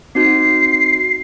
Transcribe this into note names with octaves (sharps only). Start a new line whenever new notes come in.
C4 D#4 F#4 C7